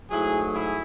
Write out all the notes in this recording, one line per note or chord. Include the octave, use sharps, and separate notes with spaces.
G#2 F#3 A3 E4 G#4
E4 G#4